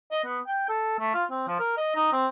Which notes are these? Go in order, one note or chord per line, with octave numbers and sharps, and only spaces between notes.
D#5
B3
G5
A4
A3
F4
C4
F3
A#4
D#5
D#4
C4